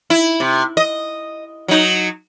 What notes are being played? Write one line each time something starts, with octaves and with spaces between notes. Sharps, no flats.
E4
C3
D#5
F#3 D#4